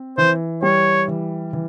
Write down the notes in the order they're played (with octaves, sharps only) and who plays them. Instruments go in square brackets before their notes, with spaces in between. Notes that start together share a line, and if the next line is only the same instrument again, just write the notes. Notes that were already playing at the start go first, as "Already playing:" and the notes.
Already playing: [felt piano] C4
[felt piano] E3 [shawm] C5
[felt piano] G3 [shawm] C#5
[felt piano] E3
E3